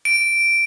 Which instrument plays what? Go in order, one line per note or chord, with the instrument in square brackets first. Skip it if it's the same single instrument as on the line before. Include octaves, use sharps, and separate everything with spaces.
[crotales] D7